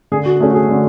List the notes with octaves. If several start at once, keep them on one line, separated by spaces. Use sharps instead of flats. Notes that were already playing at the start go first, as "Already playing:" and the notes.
D3 G#4
F#4
A3 C#4 G#4
F#4
G#4
D3